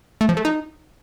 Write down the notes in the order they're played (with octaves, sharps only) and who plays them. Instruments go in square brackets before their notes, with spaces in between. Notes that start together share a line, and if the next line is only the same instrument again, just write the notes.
[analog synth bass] A3
F3
A3
D#4